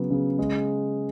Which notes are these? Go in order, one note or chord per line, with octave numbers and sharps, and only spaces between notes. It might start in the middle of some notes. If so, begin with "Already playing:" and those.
Already playing: C#3 F#3 B3
C#3
G#3